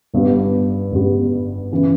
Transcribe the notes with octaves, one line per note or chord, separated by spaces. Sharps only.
G1 G2 G3 B3
G1 G2 G3 B3
C#3 E3